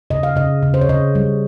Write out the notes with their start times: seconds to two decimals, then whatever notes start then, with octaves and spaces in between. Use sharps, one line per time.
0.11 C#3 D#5
0.23 F5
0.36 C#3 D#5
0.63 C#3
0.74 C5
0.81 C#5
0.89 C#3 D#5
1.15 G3